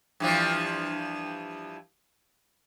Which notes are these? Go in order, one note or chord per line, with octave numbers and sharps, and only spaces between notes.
G2 E3 F3